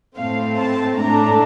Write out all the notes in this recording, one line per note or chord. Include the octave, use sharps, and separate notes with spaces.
A2 A3 C4 F5
A5
A2 A3 D4 A#5